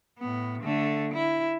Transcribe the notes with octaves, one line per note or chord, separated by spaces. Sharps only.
A2 B3
D3 A3
E4